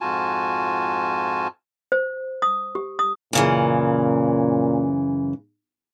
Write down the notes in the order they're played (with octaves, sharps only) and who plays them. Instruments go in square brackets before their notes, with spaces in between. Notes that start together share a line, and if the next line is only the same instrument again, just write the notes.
[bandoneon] F2 G#2 F4 F#4 G#5 A5
[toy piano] C5
D#6
G4
D#6
[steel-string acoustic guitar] F#2 C#3 E3 [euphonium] A#2